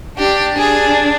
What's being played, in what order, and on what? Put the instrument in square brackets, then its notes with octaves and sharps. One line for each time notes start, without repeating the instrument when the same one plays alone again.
[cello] D4 [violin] G4
[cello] D4 [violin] G#4